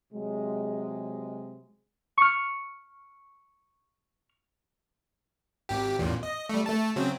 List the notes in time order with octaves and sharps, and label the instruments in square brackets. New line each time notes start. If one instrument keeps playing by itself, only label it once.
[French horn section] C3 F#3 G#3
[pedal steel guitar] C#6 F6
[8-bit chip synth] G#1 G4
A1 E2 A#2
D#5
G3 A3
A3 A5
C#3 F#3 C4